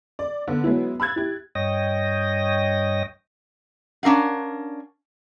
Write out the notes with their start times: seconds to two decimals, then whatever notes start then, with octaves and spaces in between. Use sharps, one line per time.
0.19 D5
0.48 D3 B3
0.64 F#3 G#3 B3 E4
1.00 B5 E6 F#6 G#6 A6
1.16 E4 G4
1.55 G2 C#5 D#5 G5 D#6 A#6
4.03 C#4 D4 A#4 F5 F#5